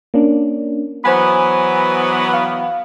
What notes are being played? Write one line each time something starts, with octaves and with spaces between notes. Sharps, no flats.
A#3 C#4 D4
E3 F#3 B3 C5 G#5 B5
F5